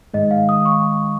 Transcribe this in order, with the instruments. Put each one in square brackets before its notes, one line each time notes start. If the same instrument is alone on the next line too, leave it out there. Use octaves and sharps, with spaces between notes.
[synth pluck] G#2 D#3 G#3 [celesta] D#5
[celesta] F5
D#6
C#6